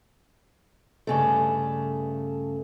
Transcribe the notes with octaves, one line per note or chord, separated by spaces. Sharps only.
G2 C#3 A3